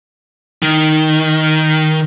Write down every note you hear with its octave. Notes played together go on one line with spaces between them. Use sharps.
D#3